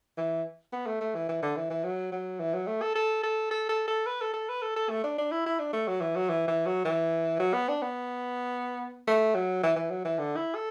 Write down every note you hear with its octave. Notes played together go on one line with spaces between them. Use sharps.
E3
B3
A3
A3
E3
E3
D3
E3
E3
F#3
F#3
E3
F#3
A3
A4
A4
A4
A4
A4
A4
B4
A4
A4
B4
A4
A4
A3
D4
D4
E4
E4
D4
A3
F#3
E3
F#3
E3
E3
F#3
E3
F#3
B3
D4
B3
A3
F#3
E3
E3
F#3
E3
D3
E4
A4